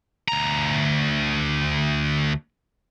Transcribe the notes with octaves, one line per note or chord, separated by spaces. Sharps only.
D2 A#5